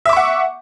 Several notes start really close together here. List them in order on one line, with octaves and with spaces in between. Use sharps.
E5 D6 C#6 F#5